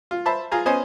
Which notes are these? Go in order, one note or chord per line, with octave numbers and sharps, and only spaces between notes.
F4
C5 E5 A5 B5
F4 G#4 G#5 A#5
B3 C#4 C5 D#5 G#5